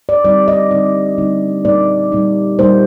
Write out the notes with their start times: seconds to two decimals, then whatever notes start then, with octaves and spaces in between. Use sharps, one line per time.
0.09 D5
0.24 D3 G3 C4 D#4 D5
0.48 D#5
0.71 D3 G3 C4 D#4 D5
1.18 D3 G3 C4 D#4
1.65 A#2 G3 A#3 D#4 D5
2.12 A#2 G3 A#3 D#4
2.59 A#2 G3 A#3 D#4 C5